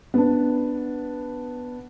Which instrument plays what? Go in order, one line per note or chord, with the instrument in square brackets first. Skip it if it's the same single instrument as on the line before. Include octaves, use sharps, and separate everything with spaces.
[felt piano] B3 D4